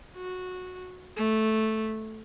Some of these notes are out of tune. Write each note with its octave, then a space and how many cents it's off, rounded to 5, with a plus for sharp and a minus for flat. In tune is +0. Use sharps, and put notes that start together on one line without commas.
F#4 -15
A3 -5